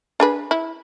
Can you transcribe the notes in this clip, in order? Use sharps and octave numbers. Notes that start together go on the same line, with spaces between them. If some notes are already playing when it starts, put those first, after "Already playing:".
D4 G#4 B4
E4